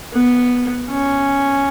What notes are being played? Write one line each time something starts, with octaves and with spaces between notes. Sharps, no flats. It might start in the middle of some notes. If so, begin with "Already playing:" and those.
B3
C#4